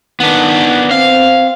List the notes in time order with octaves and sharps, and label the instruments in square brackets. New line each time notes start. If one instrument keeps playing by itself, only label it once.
[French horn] D#3 [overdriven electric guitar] B3 D4
[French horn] C4 [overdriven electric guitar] F5